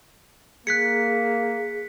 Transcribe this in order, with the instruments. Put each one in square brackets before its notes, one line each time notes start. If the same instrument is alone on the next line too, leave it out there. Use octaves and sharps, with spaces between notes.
[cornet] A#3 [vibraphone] G#4 [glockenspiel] F#6 B6 C#7